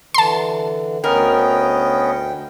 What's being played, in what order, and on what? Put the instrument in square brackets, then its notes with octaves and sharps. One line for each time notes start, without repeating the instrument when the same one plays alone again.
[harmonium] D3 E3 [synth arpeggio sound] A5 C6
[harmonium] D2 G5 [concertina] B3 C#4 D#5 [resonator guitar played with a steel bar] A#4